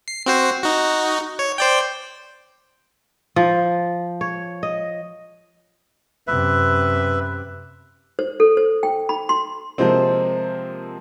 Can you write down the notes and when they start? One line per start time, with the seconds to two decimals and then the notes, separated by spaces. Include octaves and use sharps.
0.08 C7
0.26 C4 F#4 C5
0.63 D#4 F#4
1.39 C#5
1.58 C5 D5 G5
3.36 F3
4.21 C#5
4.63 D#5
6.27 F#2 C3 B4 E5
8.19 C5
8.40 A4
8.57 C5
8.83 G5
9.09 B5
9.29 C6
9.78 C3 F3 G#3 A#3 C4